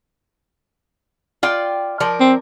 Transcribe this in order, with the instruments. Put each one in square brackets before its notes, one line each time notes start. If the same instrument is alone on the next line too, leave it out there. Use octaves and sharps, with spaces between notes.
[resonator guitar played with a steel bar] F4 D5 G5
F3 A#4 D5
[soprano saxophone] C4